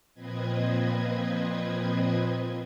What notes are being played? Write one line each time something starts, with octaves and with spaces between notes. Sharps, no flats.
A#2 F3 C4 B4 D#5 G#6